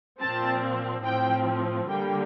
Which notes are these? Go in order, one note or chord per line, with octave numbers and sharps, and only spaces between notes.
A#2 F3 C4 A5
A2 F3 C4 G5
D3 G3 A#3 G5